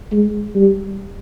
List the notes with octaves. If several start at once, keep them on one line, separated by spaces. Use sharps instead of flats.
G#3
G3